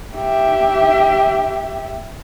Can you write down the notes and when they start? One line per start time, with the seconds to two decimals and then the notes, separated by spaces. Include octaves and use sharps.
0.15 G4 E5